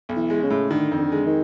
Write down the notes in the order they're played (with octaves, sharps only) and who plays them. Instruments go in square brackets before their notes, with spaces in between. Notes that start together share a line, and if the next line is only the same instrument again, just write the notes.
[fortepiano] B1
[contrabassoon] E3
[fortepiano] G#3
[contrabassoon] C#3
[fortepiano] A2
[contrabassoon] D3 [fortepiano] D#3
[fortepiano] F2
[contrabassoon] D3
[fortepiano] G#3
[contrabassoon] D#3